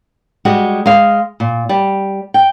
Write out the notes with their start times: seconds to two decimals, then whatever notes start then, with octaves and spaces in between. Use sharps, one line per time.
0.45 G3 G#3 F#4 G4
0.86 G#3 F5
1.40 A#2
1.69 G3
2.34 G5